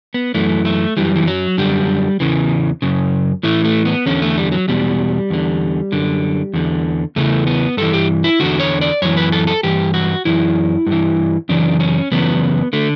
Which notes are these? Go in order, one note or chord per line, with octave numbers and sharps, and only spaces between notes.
B3
F#2 E3 A3
A3
F#2 E3 G3
E3
F#3
F#2 D3 G3
E2 C#3 E3
F#2 C#3
A2 E3 A3
A3
B3
E2 D3 C#4
A3
G3
F#3
E2 B2 G3
E2 D3
F#2 D3
E2 D3
E2 C#3 E3 A3
B3
G2 E3 A4
G4
E4
E2 D3 F#4
C#5
D5
F#2 E3 C#5
B4
A4
A4
G2 E3 G4
F#4
F#2 E3 E4
G2
E3
F#2 C#3 E3 D4
C#4
F#2 C#3 E3 B3
D3 A3